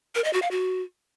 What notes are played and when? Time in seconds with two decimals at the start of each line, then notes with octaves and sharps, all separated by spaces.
0.15 A#4
0.24 D#5
0.33 F#4
0.42 F5
0.51 F#4